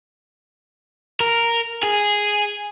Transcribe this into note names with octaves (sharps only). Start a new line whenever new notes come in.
A#4
G#4